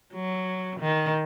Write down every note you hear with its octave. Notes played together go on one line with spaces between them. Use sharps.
F#3
D#3